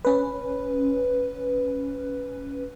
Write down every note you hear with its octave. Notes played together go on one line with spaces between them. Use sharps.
C#4 B4